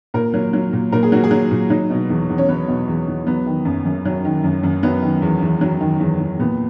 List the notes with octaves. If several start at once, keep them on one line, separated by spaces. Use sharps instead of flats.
A#2 A#4
F#3
F#3
A#2
A#2 A#4
G#4
F#3 F#4
G#4
F#3
A#2
F#3 D#4
B2
E2
E2
C#4
F#3 B3
B2
E2
E2
F#3 B3
D#3
F#2
F#2
F#3
D#3
F#2
F#2
F#3 B3
D#3
E2
E2
F#3
D#3
E2
E2
A#2 B3